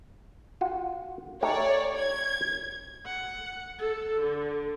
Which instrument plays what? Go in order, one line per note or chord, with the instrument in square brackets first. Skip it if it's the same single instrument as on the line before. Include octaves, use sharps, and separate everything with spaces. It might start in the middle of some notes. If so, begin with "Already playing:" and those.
[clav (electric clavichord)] F4 F#4
[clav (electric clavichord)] A3 D#4 G4 [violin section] C#5 D5
[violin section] G#6
[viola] F#5
A4
D3